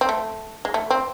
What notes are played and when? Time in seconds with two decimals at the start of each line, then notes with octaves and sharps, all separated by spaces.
0.01 C4
0.09 A3
0.65 G#3
0.74 A3
0.90 C4